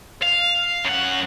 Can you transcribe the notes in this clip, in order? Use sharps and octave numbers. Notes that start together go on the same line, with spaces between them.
F5
F#2 F#5